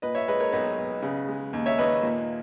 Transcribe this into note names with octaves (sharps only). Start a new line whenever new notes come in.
A#2 B4 D#5
C#5 E5
G#3 B4 D#5
A#4 C#5
B1 B4 D#5
B1
C#3
G#3
D#2
C#5 E5
D#2 B4 D#5
A#2